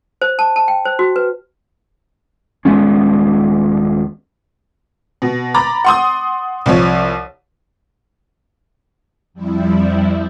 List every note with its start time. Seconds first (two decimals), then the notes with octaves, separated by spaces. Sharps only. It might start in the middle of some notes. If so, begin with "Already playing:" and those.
0.22 C5
0.39 A5
0.56 A5
0.68 G5
0.85 C5
0.99 F#4
1.16 B4
2.65 D#1 G#3 B3 C#4
5.22 B2
5.54 A#5 B5 D6 A6
5.85 F#5 C6 D#6
6.66 C2 F3 C#5
9.33 F2 G3 E4